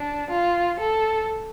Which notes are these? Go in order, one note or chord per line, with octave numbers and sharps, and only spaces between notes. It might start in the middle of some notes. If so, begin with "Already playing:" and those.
Already playing: D4
F4
A4